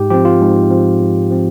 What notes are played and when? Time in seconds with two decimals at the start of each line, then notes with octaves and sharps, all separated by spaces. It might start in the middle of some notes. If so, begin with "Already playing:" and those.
Already playing: G#2 G4
0.10 F3 C4 G4
0.25 F4
0.41 G#2
0.70 F3 C4
1.00 G#2
1.30 F3 C4